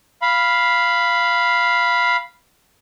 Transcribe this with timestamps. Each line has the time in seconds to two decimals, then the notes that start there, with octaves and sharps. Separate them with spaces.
0.22 F5 B5